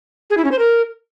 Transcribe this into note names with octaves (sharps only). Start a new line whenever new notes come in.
G#4
E4
C#4
C5
A#4